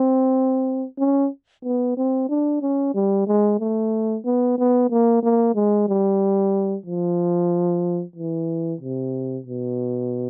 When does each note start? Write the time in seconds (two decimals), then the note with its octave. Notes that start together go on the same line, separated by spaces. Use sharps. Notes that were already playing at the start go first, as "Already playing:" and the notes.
Already playing: C4
0.99 C#4
1.64 B3
1.97 C4
2.29 D4
2.62 C#4
2.94 G3
3.27 G#3
3.60 A3
4.25 B3
4.58 B3
4.90 A#3
5.23 A#3
5.55 G#3
5.88 G3
6.86 F3
8.16 E3
8.81 C3
9.46 B2